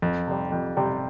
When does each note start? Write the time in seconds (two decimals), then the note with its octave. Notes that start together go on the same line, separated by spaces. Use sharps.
0.02 F2
0.27 C3 G3
0.52 F2
0.77 C3 G3